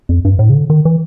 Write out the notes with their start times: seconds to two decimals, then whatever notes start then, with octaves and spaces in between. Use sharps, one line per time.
0.09 F2
0.25 G2
0.39 A2
0.50 C#3
0.54 D3
0.70 D#3
0.85 E3